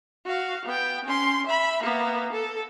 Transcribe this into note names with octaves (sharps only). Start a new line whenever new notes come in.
F#4 F5
B3 G5
C#4 C6
E5 B5
A#3 B3
A4